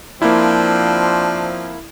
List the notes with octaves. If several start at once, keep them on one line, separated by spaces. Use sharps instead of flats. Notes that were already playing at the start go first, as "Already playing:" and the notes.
F3 A#3 C4 D4 E4